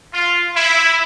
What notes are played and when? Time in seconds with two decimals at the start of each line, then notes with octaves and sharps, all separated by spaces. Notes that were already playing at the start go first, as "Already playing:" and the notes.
0.13 F4
0.55 E4